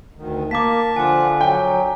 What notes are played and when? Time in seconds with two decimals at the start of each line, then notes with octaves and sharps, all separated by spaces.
0.16 D2 D#3
0.51 A#3 A5 D6 B6
0.96 D3 F3 F4 F#5 G#5 D6
1.41 F#3 G5